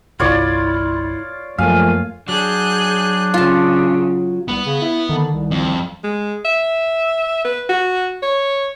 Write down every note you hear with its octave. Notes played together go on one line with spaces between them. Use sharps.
G1 C2 E4 F4 C#5 D5
F#2 F3 A3 A#3 F5 G#5
F#3 D4 G#4 F#6 G6
C#3 F4 A5
C2 B3
C#3
E4
D3 D#3
C2
F2
G#3
E5
B4
F#4
C#5